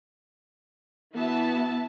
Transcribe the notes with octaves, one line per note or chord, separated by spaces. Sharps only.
E3 B3 E4 F#4 E5 A5